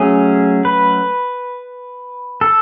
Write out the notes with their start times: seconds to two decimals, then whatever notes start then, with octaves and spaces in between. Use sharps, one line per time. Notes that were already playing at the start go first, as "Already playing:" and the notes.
Already playing: F#3 A3 C#4 G#4
0.65 B4
2.41 A4